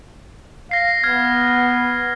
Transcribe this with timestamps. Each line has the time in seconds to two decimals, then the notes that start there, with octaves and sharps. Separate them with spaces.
0.71 F5 A#6 C7
1.03 B3 F6 G#6